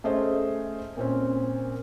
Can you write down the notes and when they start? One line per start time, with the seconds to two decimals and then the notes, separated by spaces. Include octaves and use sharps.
0.04 A3 C#4 G#4 C5 D#5
0.97 A#2 C4 C#4